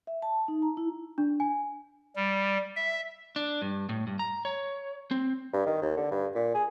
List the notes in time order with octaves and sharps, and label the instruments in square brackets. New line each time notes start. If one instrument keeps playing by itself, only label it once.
[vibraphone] E5
A5
D#4
A#5
E4
[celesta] D4
G#5
[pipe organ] G3
E5
[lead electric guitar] D4
G2
A2
G2
A#5
C#5
C4
[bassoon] G2
D#3
D#2
D3
G2
A#2
G#4